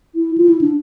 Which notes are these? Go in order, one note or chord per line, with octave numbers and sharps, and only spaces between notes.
E4
F4
E4
D4